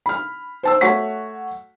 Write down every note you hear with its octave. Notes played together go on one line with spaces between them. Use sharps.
B5 F6
C5 A5 E6
A3 F#4 C#5 F#5 C#6 B6